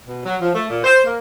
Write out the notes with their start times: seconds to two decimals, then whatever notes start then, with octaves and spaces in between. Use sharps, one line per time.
0.06 B2
0.25 F#3
0.41 F3
0.54 A3
0.69 A#2
0.84 C5
1.04 A#3